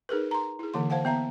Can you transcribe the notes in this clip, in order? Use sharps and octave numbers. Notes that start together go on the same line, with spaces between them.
D#4 G#4 A#4 B4
A#5 C6
E4 G#4
D3 E3 A#3 C6
C5 F5 F#5 A5
B3 E5 A#5